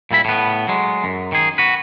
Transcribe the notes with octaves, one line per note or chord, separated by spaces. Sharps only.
A#2 G3 E4 B5
A2 B3
F#3 G#3
F#2
D#3 G#4
F#4 B4